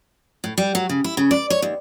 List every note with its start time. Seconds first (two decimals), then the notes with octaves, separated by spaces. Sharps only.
0.44 A2
0.58 G3
0.75 F#3
0.89 C#3
1.04 E4
1.17 C#3
1.31 D5
1.50 C#5
1.62 D#2